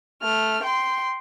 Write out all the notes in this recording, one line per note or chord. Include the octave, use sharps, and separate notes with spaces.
A3 F6
G5 C6